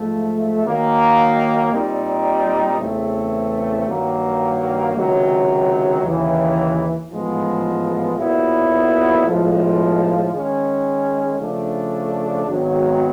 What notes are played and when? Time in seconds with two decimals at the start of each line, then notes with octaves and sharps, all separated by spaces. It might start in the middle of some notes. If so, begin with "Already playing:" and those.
Already playing: G#2 F3 A3
0.66 D#3 F#3 A#3
1.72 A#2 G3 C4 D#4
2.80 E2 C#3 E3 A3 C4
3.87 G2 D#3 F#3 A#3
4.95 C#2 C3 D#3 F#3
6.03 D#2 C#3 E3
7.09 A1 G#2 F3 G#3 B3
8.17 B1 A#2 F#3 B3 E4
9.24 B1 A2 F3 G#3
10.32 D#3 G#3 C#4
11.39 C#3 F3 A3 D4
12.47 G#1 G#2 D#3 F#3 B3